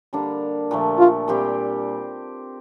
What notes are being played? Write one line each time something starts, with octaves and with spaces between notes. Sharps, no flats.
D3 G3 A#3 D4
A#2 F3 A3
F4
A#2 G3 C4 G4